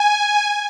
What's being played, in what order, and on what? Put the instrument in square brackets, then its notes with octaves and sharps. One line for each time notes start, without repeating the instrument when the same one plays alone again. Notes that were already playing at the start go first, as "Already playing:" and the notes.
Already playing: [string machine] G#5